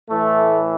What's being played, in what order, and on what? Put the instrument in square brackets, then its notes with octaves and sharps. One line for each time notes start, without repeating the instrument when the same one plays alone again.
[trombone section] A2 E3 A3